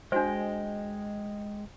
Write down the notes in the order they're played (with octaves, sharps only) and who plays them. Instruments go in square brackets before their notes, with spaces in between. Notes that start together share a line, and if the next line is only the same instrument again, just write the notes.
[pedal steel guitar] G#3 D#5 G5 [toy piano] D4 F#4 C5